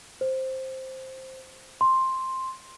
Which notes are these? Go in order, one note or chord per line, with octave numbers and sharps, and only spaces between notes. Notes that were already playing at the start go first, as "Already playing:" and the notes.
C5
C6